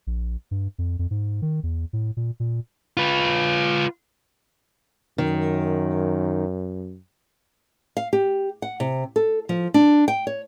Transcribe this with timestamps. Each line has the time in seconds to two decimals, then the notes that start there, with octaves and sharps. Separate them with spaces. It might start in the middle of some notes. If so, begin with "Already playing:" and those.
0.07 A#1
0.51 G2
0.78 F2
0.99 F2
1.11 G#2
1.42 D#3
1.63 E2
1.93 A2
2.17 A#2
2.40 A#2
2.97 F4 B4
5.18 F#2 D#3
7.97 F5
8.13 G4
8.62 F#5
8.80 C3
9.16 A4
9.49 F3
9.74 D4
10.08 G5
10.27 C#5